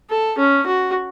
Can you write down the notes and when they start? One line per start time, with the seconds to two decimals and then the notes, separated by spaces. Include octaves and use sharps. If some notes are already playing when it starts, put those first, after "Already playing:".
0.10 A4
0.38 C#4
0.66 F#4